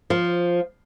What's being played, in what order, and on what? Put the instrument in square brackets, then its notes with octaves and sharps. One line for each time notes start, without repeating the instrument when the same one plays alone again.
[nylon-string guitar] F3